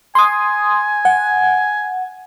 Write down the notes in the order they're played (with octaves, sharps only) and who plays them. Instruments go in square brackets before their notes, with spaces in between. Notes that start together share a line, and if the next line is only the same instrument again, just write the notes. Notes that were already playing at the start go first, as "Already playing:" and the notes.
[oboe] G#5 [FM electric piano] C6 D#6
[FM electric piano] F#5